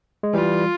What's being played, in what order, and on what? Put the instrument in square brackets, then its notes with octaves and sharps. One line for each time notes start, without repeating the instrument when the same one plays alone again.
[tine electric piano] G#3
[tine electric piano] E3 G3 [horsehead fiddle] F4